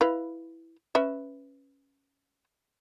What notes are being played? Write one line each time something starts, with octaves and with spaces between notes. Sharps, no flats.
E4 B4 F5
C#4 B4 E5